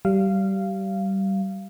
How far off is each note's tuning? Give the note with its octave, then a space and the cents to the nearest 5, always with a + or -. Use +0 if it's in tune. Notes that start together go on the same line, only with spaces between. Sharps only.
G3 -20 F5 -15